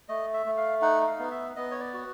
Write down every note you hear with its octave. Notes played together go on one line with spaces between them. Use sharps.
A3 D#5
E5
A3
F5
D#4 F#5
F5
B3
E5
B3 D#5
C#5
D5
F#4